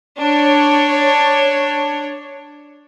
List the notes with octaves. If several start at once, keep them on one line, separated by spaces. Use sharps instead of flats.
D4 C#5